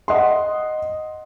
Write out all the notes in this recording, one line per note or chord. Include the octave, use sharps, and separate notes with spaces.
D#5 F#5 C6